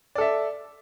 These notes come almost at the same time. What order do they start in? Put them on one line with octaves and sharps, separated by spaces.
D5 A4 E5